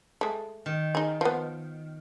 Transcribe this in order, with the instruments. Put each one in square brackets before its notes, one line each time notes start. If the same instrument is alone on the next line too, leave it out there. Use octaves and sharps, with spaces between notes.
[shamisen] G#3 A3
[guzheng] D#3
[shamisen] D#4 G#4
F3 B3